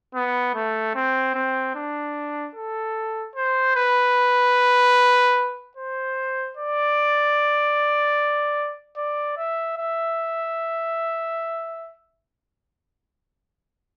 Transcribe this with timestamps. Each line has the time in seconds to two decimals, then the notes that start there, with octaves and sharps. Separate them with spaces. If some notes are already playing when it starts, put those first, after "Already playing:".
0.15 B3
0.55 A3
0.95 C4
1.34 C4
1.75 D4
2.55 A4
3.35 C5
3.76 B4
5.77 C5
6.57 D5
8.97 D5
9.37 E5
9.78 E5